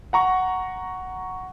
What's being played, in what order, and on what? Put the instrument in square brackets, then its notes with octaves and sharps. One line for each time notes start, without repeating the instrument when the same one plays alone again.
[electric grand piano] F#5 A#5 C#6